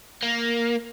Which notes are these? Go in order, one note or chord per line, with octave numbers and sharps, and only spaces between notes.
A#3